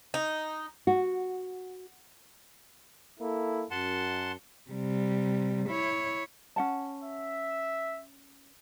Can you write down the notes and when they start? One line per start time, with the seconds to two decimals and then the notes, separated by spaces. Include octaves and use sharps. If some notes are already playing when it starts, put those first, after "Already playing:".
0.14 D#4
0.87 F#4
3.20 A#3 E4 A4
3.71 F#2 F#5 A5 C6
4.71 C3 G3
5.70 E4 C#5
6.56 C#4 F#5 A5
7.04 E5